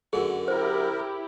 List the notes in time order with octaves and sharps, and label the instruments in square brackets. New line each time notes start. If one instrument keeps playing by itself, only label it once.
[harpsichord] F#2 D3 [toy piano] G#4 A#4
[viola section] E4 G4 [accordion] A#4 [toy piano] C5